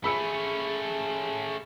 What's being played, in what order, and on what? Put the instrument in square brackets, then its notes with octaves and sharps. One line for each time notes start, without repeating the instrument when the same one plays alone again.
[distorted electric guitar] A3 C#4 [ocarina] G#4 [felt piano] B5 E6 C#7